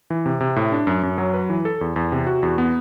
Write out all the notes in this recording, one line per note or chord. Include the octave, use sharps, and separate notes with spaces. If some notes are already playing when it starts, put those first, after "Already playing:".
E3
C3
C3
A2
D4
F#2
F#2
F#3
B4
E3
A4
E2
E2
C3
F#4
E2
B3